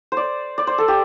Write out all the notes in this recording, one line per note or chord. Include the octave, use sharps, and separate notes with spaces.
C5 D5
D5
C5
A4
G4